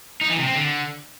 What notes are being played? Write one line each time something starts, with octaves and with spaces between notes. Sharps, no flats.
D#4
E3
C3
C4
D3